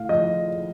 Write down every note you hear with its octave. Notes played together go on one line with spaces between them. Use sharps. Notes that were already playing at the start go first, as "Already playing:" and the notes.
Already playing: A2 A3 F5
F3 D#5